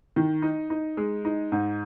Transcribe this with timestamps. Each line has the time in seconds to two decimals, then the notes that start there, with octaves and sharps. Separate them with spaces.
0.16 D#3
0.42 D#4
0.70 D#4
0.97 G#3
1.25 D#4
1.52 G#2